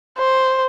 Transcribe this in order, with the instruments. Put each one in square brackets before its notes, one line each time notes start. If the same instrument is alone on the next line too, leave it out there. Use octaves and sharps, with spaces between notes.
[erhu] C5